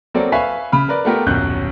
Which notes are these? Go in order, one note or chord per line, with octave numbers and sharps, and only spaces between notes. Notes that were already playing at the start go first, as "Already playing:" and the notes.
F#3 A#3 C4 A4 C#5 D5
B4 E5 F5 G#5 C#6 B6
C#3 B5 F6
A#4 B4 D5
A3 B3 F4 G4 A#4
D#1 B1 F#2 C#4 F#6 G6